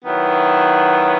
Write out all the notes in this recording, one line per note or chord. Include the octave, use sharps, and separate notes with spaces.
D#3 F#3 B3 E4